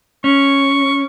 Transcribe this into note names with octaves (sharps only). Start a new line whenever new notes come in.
C#4 C#6